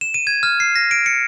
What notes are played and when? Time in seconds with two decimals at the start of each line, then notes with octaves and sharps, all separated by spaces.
0.01 E7
0.14 D#7
0.27 G#6
0.43 F6
0.60 C7
0.76 A#6
0.91 D7
1.06 C#7